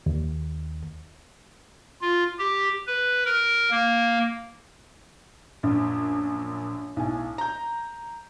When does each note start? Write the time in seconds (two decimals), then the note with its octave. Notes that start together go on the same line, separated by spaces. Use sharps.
0.06 D#2
2.01 F4
2.38 G4
2.87 B4
3.25 A#4
3.71 A#3
5.63 A#1 F#2
6.96 B1 A2 G#5
7.38 A#5 G6